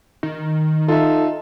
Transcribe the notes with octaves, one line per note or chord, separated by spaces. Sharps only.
D#3
D#4 F4 A4 E5